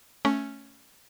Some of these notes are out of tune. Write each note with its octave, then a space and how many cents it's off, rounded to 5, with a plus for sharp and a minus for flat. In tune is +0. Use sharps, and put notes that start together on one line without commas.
A3 +0 C#4 +0